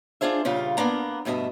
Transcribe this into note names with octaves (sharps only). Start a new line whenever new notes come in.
D4 F4 G#4 C5 E5
A#2 C#3 G3 F4
A#3 B3 D4 A#5
D2 G2 B2 D#5 E5